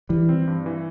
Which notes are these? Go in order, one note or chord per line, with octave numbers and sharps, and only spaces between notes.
E3 G3
C4
G2
E3